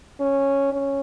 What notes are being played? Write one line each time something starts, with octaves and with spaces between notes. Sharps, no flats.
C#4
C#4